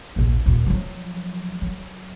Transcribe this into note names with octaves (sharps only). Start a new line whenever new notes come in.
A#1 D#2
D#2 A#2
F3 F#3
F#3